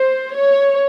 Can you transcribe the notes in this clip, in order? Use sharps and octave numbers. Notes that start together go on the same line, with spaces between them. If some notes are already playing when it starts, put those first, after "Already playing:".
Already playing: C5
C#5